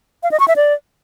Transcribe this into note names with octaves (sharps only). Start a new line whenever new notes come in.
F5
D#5
C#6
E5
D5